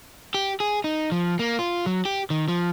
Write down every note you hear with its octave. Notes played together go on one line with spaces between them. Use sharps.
G4
G#4
D#4
F3
A#3
F4
F#3
G4
D#3
F3